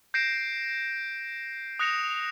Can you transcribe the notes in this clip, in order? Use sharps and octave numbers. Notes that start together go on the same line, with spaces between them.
G6 A#6 C7 D7 E7
D#6 F#6 A#6 C#7 E7 F7